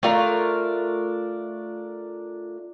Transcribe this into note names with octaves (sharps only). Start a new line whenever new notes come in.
A3 D4 F4 A#4